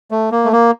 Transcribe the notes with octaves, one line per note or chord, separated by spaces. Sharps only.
A3
A#3
A3
A#3